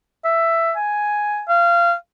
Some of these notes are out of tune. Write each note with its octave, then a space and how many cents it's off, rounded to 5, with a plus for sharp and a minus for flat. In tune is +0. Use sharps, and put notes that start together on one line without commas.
E5 +10
G#5 +5
F5 -25